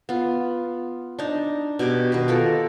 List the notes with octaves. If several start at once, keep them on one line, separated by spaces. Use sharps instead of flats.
B3 F4
D4 D#4
B2 G4 G#5 D6
B2 D#3 B4
F4 A4 A#4